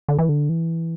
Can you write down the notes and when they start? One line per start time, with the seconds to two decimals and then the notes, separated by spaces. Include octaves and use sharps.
0.08 D3
0.19 E3
0.29 D3
0.49 E3